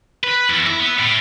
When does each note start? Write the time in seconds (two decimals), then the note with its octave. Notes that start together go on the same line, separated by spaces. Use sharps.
0.24 B4
0.50 E2
0.66 E4
0.80 B3
0.99 A2